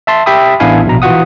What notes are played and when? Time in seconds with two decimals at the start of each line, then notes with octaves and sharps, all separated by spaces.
0.07 E5 A5 C6
0.26 G4 E5 G5 B5 D#6
0.60 A1 B3 D4 E4 F5 G#5
0.86 A#1 B2 A#5
1.02 E3 F4 F#4 F#5 D#6